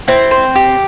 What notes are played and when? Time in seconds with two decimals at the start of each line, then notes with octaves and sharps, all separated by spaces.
0.08 C4 E4
0.31 C5
0.55 G4